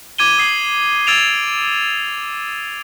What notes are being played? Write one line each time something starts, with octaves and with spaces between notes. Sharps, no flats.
D6 G#6 D#7 G7
D#6 C7 F#7
E6 G#6 A6 D7 E7 F7